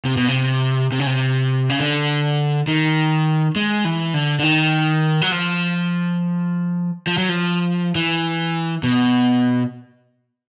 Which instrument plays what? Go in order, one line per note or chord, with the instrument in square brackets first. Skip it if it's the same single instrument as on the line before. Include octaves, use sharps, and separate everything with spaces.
[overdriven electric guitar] C3
B2
C3
C3
C#3
C3
C#3
D3
D#3
G#3
E3
D3
D3
D#3
F#3
F3
F3
F#3
F3
E3
B2